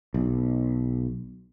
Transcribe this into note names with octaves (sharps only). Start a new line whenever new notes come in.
B1